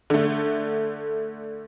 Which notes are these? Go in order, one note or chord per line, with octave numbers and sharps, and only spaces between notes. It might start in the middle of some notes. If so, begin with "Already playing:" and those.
D3 A3